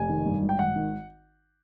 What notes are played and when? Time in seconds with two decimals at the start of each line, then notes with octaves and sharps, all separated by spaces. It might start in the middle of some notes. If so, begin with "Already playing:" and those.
Already playing: F1 G#5
0.09 D#3
0.26 G2
0.42 G#1
0.49 G5
0.59 G#1 F#5
0.76 D#3